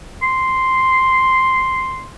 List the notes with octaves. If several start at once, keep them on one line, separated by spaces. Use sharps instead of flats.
C6